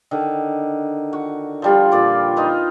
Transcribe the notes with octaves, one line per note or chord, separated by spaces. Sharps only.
D3 D#3
F#4
F3 G3 F4
A#2 D5
D#4 F4 B4